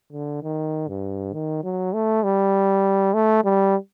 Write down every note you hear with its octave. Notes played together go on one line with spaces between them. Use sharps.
D3
D#3
G2
D#3
F#3
A3
G3
A3
G3